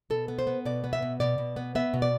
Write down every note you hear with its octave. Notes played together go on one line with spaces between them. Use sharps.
B2 A4
B3
C5
B3
B2 D5
B3
E5
B2
B2 D5
B2
B3
B3 E5
B2
D5